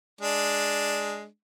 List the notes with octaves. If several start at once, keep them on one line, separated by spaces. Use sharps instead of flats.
G#3 D4